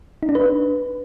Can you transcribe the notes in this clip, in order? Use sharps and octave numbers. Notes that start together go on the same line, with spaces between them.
D#4
D4
B4